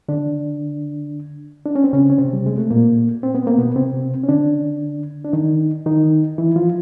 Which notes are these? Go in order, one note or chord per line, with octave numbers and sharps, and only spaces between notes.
D3 D4
D4
C#4
C4
C#3 C#4
C#4
C3 C4
G3
G#3
A3
A#2 A#3
C4
B3
A#3
B2 B3
C3 C4
C#4
D3 D4
D4
D#3 D#4
D#3 D#4
E3 E4
F3 F4